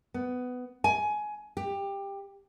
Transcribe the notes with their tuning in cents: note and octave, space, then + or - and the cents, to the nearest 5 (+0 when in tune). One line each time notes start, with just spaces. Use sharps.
B3 +15
G#5 +20
G4 +15